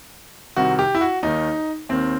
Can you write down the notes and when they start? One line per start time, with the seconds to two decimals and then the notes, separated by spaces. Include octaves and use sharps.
0.56 C2 C3 D#3 F#4
0.79 G4
0.95 E4
1.01 F#4
1.23 D#2 D#3 D#4
1.89 D#2 D#3 C4